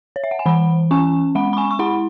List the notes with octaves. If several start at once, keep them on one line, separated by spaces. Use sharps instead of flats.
C#5
E5
F#5
G#5
E3 F#5 B5
C#4 G#5 C#6
G#3 F#5 B5
B5
G#5 C#6
C#6
E4 F#5 B5